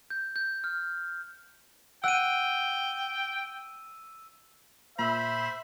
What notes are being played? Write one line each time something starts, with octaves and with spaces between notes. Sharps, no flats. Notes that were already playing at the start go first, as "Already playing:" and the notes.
G6
G6
F6
F#5 G5 E6 D#7
A#2 C5 E5 B5